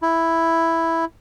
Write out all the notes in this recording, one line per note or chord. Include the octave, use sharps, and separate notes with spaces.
E4